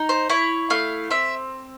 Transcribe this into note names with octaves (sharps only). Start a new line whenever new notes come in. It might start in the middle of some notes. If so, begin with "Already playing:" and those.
Already playing: D#4
C5
E4 C#5
A3 F5
C4 E5